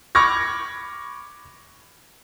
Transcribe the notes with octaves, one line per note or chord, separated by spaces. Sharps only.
B5 C#6 D6 F6 G#6 A#6